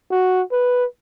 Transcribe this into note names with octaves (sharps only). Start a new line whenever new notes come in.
F#4
B4